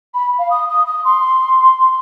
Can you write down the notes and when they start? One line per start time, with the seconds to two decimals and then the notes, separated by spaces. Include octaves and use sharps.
0.14 B5
0.39 F5
0.50 D#6
0.69 D#6
0.86 D#6
1.05 C6